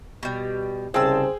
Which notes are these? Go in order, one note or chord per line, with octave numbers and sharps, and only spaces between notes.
B2 G3
C2 C#3 C4 G#4 C5 G5 A5 E6